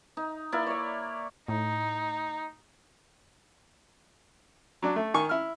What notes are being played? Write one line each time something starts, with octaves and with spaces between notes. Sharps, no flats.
D#4
A#3 E4 D5 A#5
C#5 D5
A2 D#4
F#3 D4
A3
D#3 G#5 C#6
E4 F6